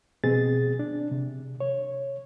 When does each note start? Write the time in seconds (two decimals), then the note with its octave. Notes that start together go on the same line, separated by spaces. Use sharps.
0.24 B2 C4 G#4 A6
0.79 D4
1.11 C3
1.60 C#5